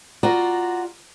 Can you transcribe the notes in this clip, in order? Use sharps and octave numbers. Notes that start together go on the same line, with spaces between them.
F4 F#4 D5 A#5